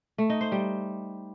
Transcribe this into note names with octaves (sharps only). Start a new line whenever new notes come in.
A3
D#4
C5
G3